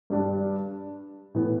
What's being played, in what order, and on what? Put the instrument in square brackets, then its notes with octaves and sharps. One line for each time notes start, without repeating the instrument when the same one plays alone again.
[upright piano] G2 G3 D4
A2 E3 B3